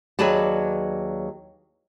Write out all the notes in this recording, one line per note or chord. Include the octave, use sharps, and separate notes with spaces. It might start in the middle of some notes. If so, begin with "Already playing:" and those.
D#2 F#3 G#4 B4 D5 A5